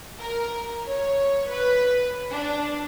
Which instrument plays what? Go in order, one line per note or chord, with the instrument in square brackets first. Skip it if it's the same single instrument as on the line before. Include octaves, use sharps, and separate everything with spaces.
[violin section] A#4
C#5
B4
D4